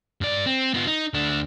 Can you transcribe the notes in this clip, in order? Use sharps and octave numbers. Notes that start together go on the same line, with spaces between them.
G2 D5
C4
B3 F4
D#4
D2 D4